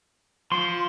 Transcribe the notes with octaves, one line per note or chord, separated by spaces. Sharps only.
F3 C6